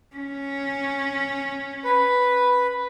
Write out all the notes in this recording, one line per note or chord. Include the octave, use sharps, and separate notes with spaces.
C#4
B4